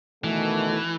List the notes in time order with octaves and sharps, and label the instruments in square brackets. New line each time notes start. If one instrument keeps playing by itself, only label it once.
[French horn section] B2 D#3 A3 [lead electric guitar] E3